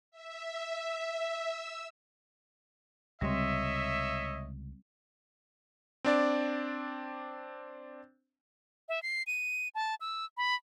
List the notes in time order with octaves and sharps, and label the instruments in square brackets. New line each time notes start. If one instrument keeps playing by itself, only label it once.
[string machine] E5
E6
[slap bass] C#2 C3 G#3 [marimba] G3 C4 [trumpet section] C#5 D#5 E5
[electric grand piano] C4 D4 D5
[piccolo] E5
C7
D#7
A5
E6
B5